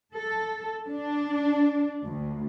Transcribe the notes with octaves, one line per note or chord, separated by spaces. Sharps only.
A4
D4
D2